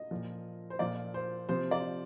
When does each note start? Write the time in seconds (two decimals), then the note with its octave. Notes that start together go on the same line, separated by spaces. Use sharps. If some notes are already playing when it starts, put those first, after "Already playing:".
Already playing: D#5
0.11 A#2 F3
0.70 C5
0.79 A#2 F3 D5
1.14 C5
1.49 C3 F3 C5
1.71 D5